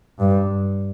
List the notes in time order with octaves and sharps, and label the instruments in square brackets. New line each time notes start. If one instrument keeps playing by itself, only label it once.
[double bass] G2